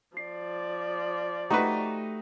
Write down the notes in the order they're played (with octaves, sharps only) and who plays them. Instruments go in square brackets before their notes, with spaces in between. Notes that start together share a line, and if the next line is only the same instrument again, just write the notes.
[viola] F3 D5 [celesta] C7
[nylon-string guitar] A3 G4 [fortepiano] D#4 F#4 B4 [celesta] A#5 C#6